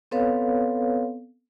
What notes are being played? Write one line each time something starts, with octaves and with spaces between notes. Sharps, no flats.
B3 C4 A4 B4 C#5 F5